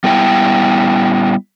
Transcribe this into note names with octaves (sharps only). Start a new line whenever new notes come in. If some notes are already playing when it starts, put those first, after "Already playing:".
G3 B3 E4 G5